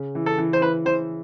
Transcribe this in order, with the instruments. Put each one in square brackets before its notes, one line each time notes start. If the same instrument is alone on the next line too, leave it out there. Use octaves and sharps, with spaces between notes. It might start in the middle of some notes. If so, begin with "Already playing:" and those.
Already playing: [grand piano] C#3
E3
[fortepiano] A4
[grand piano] E3
[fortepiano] C5
[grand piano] E3 [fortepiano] B4
[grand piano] E3 [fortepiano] C5